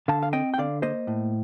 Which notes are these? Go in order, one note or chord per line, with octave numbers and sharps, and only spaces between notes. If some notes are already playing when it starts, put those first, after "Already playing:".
D3 F5 A5
F5
C4 D#5 G5
G5
D3 D5 F5
A#3 C5 D#5
A2